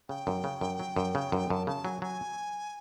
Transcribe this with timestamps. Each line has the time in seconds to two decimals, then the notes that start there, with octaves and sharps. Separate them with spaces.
0.09 C#3 G5
0.27 F#2
0.44 C#3
0.61 F#2
0.79 F#3
0.96 F#2
1.15 C#3
1.32 F#2
1.50 F#2 A5
1.67 C#3 A5
1.85 F#3 G#5
2.02 F#3 G#5